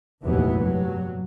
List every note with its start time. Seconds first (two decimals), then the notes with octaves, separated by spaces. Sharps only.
0.22 F1 A#1 D#2 E3 F#3 B3
0.56 G2 F#3